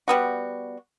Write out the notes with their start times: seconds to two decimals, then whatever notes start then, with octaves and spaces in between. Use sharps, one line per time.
0.08 G3 B3 F#4